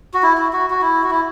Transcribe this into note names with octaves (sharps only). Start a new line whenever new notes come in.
F#4
E4
E4
F#4
F#4
E4
F#4
E4